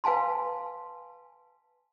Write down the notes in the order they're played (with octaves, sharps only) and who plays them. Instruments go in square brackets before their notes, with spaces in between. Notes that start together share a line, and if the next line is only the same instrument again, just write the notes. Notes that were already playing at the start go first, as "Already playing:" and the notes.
[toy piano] B4 F5 G#5 A5 C6